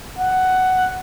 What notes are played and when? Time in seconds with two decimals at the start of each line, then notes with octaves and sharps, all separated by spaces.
0.19 F#5